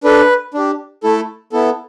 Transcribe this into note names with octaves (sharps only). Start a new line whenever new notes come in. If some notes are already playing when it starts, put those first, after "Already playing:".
D4 A4 B4
D4 G4
A3 E4 A4
B3 E4 A4